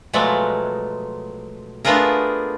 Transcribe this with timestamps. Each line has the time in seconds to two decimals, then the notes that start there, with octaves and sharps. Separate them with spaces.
0.13 B2 F3 F#3 G#3 A3 D5
1.85 A3 B3 D4 F4 G#4 A#4